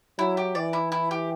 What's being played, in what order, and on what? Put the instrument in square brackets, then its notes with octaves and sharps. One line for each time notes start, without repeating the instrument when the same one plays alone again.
[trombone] F#3 [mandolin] E4
[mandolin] G4
[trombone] E3 [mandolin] D5
[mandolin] E4
E4
G4